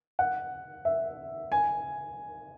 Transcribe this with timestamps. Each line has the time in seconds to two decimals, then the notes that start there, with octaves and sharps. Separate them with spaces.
0.19 F#5
0.85 E5
1.52 G#5